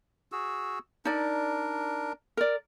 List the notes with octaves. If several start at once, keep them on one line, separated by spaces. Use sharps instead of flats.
F#4 G#4 E6
D4 D#4 A#4 D5
A#4 D5